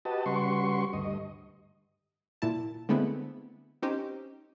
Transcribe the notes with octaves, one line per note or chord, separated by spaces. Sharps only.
F#4 G4 B4 D#5 A5
C#3 G3 F#4 B4 C6 C#6
D2 G2 D#5
A#2 E4 A5
D3 G#3 A3 B3 C4 E4
C4 C#4 D#4 G4 C5